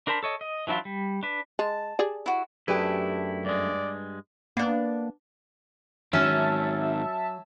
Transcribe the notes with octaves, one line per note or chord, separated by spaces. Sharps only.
D4 A#4 C5 A5 B5
A4 C#5 D#5
D#5
E3 F#3 D4 E4 F4
G3
D4 B4
G#3 A5
G4 G#4 D5
E4 F#4
F#2 A3 D4 E4 G4 G#4 B4
G2 G#3 D5
A#3 B3 D4
G#2 D#3 F#3 C#4 E5 A5